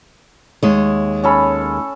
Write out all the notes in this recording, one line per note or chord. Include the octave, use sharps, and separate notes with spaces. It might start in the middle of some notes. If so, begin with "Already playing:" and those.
D#2 G#3 C#5
C#4 A4 B5